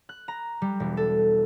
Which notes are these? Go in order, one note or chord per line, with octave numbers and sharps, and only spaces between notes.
F#6
A#5
G3
E1
A4